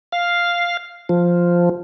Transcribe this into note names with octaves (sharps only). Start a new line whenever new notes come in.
F5
F3